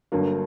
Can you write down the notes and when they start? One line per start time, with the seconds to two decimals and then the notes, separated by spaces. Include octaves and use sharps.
0.12 G1 G2 D3 F#3 A#3